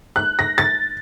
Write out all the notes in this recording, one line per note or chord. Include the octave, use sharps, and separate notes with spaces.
F#6
A#6
A6